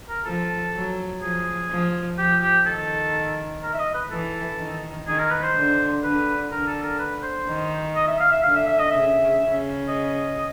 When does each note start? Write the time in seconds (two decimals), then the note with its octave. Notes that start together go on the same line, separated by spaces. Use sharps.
0.09 A#4
0.25 F3 A4
0.74 F#3
1.21 F3 G#4
1.70 F3
2.17 F3 G4
2.41 G4
2.66 D#3 A4
3.63 A#4
3.73 E5
3.79 D#5
3.94 B4
4.10 E3 A4
4.59 D#3
5.07 D#3 G#4
5.19 A#4
5.30 B4
5.43 C5
5.55 D3
6.03 D3 B4
6.51 D3 A#4
6.67 A4
6.83 A#4
6.99 B4
7.23 C5
7.47 D#3
7.95 D#5
8.07 E5
8.20 F5
8.31 E5
8.43 D3 F5
8.56 E5
8.67 E5
8.79 D#5
8.91 C#3 E5
9.40 C#3
9.88 D#5